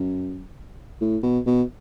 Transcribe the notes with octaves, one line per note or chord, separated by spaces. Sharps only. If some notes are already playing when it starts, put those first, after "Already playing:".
Already playing: F#2
A2
B2
B2